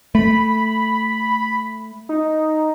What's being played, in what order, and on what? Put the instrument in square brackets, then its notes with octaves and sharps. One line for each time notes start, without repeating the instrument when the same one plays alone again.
[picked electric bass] A3 [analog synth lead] B5
[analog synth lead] D#4